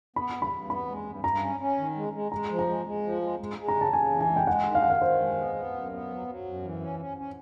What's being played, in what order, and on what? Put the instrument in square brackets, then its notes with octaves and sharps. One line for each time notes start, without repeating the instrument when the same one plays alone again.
[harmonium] B3 [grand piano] B5
[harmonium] G2
[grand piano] B5
[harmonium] G2
[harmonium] B3 [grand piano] B5
[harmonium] G#3
G2
[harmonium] G2 [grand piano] A#5
[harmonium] C#4
C#4
D#3
G#3
G#3
[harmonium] G#3 [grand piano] A#5
[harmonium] F3
[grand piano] A#5
[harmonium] G#3
G#3
F3
G#3
G#3
G#3
[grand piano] A#5
[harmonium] C#3
[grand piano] A5
[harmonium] C#3 [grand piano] G#5
[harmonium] E3
[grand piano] G#5
[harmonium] G#3
[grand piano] G5
[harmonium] G#3 [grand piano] F#5
[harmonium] D#3
[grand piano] F5
[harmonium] D#3 [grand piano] F#5
[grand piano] F5
[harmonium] D#3 [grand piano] C5
[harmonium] G#3
B3
B3
F#2
B3
F#3
F#3
F#2
E3
C#4
C#4
C#4